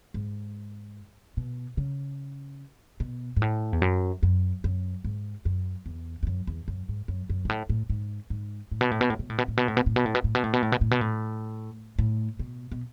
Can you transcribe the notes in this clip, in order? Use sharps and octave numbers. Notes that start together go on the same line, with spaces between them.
G#2
B2
C#3
B2
G#2
A2
E2
F#2
F#2
F#2
G#2
F#2
E2
E2
F#2
E2
F#2
G#2
F#2
F#2
G#2
A2
A2
G#2
G#2
A2
B2
A2
B2
A2
B2
A2
B2
A2
B2
A2
B2
A2
B2
A2
B2
A2
B2
A2
B2
A2
B2
A2
B2
A2
A2
B2
B2